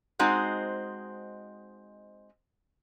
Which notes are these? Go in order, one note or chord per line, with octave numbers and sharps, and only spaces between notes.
G#3 C4 D#4 F#4 C5